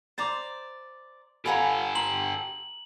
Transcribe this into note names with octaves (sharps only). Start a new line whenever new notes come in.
C5 D5 A#5 C6 D6 A6
G4 A4 C#5 F5 F#5 G#5 A#5 B5
A#5 C6 F#7